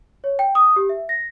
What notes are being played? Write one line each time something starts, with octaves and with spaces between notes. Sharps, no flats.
C#5
G5
D#6
G4
E5
A#6